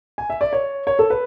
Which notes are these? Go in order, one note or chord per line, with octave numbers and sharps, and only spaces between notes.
G#5
E5
D5
C#5
C#5
A4
B4